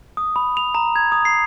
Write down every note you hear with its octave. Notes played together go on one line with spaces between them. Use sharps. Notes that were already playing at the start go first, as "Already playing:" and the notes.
D#6
B5
F7
A#5
G#6
D#6
C7